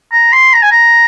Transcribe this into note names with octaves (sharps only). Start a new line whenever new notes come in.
A#5
C6
A#5
G#5
A#5